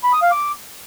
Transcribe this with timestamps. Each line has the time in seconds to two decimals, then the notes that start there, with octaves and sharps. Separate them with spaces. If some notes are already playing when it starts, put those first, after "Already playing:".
0.04 B5
0.13 D#6
0.22 F5
0.32 D6